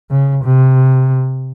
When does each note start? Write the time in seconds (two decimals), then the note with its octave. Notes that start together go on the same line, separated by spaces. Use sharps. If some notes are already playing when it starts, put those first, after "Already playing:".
0.11 C#3
0.44 C3